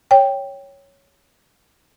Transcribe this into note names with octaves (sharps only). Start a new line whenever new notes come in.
C#5 G5